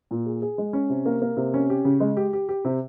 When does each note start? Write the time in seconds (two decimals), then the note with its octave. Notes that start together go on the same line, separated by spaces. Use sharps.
0.11 A#2
0.26 G#4
0.42 G#4
0.58 G#3
0.73 C#4
0.89 C3
1.06 A#3
1.22 A#3
1.37 C3
1.54 C#4
1.70 G4
1.85 C#3
2.00 G#3
2.17 G4
2.33 G4
2.49 G4
2.65 C3